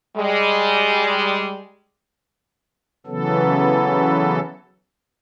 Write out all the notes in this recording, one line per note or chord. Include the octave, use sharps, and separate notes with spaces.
G3 G#3
C#3 E3 F#3 B3 A4